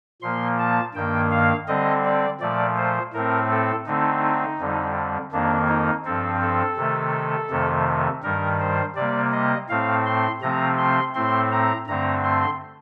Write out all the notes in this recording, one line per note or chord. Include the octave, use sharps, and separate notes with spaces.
A#2 F3 A#3 C6
A5
G2 D#3 A#3 G5
F5
D3 G3 C4 D#5
D5
A#2 F3 A3 D5
C5
A2 A3 C4 A#4
A4
D3 A3 C4 D#4
F2 D3 G3
F2 D#3 A#3 D4
D#4
G2 F3 C4 A4
A4
C3 D#3 A3
F2 C3 D#3 A3
G2 D#3 G3 A#4
C5
C3 G3 A#3 D5
D#5
A2 A3 C4 F5
C6
C3 F3 A3 C4 A#5
C6
A2 A3 C4 C6
A#5
G2 D3 A3 C4 A#5
C6